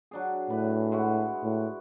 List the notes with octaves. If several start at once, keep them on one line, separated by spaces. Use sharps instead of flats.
F#3 D4 G#4
A2 D4 B4
G#3 E4 F#4
A2